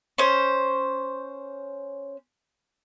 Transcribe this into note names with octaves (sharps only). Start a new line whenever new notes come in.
C#4 C5